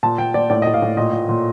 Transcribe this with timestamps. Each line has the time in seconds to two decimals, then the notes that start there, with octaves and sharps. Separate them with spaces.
0.03 A#2 A5
0.18 A#2 G5
0.34 A#2 D5
0.50 A2 D5
0.62 A2 D#5
0.74 F5
0.82 A2
0.97 A#2 D#5
1.13 A#2
1.29 A#2